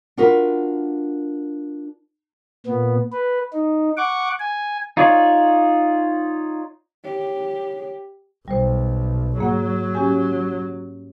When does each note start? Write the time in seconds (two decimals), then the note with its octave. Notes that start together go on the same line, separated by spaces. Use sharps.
0.17 D4 F4 F#4 A#4 B4
2.66 A#2 B3
3.12 B4
3.53 D#4
3.97 F#5 C#6 D6
4.40 G#5
4.97 D#4 F4 C#5 D5
7.05 G4 C#5
8.48 B1 G3 C5
9.38 G#2 F#3 A#3 F#5
9.95 C#4 G4 G#5